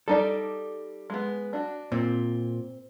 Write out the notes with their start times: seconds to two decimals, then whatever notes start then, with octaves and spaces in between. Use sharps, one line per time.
0.08 G3 D#4 A4 D5
1.10 G#3 B3
1.53 D4 F#4
1.92 A#2 C4